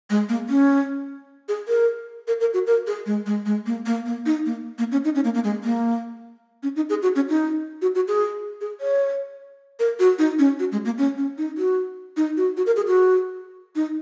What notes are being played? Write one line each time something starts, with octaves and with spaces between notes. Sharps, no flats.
G#3
A#3
C#4
G#4
A#4
A#4
A#4
F#4
A#4
G#4
G#3
G#3
G#3
A#3
A#3
A#3
D#4
A#3
A#3
C#4
D#4
C#4
A#3
A#3
G#3
A#3
C#4
D#4
G#4
F#4
C#4
D#4
F#4
F#4
G#4
G#4
C#5
A#4
F#4
D#4
C#4
F#4
G#3
A#3
C#4
C#4
D#4
F#4
D#4
F#4
F#4
A#4
G#4
F#4
D#4